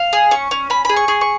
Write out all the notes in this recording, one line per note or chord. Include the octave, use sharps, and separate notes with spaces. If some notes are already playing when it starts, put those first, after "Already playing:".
Already playing: F5
G#4
C#4 C#6
C#4
C#4 B5
G#4 B5
C#6
G#4
C#6